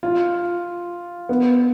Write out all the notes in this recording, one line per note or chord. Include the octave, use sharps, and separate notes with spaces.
F4
B3